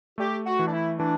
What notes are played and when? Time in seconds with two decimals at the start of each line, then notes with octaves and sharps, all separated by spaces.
0.18 A3 G4
0.45 F#4
0.59 E3
0.67 D4
0.72 E4
0.99 E3 D4